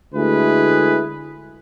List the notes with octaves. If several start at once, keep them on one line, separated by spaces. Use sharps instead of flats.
D2 G#3 A3 E4 G#4 B4